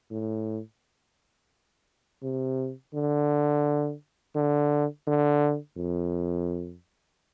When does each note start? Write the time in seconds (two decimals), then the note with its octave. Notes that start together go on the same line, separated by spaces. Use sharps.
0.11 A2
2.23 C3
2.95 D3
4.36 D3
5.07 D3
5.77 F2